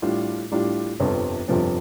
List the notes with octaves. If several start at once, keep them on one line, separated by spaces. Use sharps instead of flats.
A2 G3 D4 F4
A2 G3 D4 F4
G1 F2 C3 F3 B3
G1 F2 C3 F3 B3